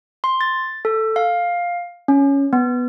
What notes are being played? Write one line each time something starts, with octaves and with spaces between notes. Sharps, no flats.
C6
A6
A4
F5
C#4
B3